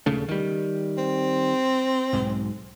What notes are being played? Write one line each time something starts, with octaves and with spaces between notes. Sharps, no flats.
D#1 C#3 A3
D#3 G3
C4
B1 G#2